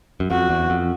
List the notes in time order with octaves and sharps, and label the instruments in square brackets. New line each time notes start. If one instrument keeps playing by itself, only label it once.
[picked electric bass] F#2
[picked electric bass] F2 [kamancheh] F#4
[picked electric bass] E2
F2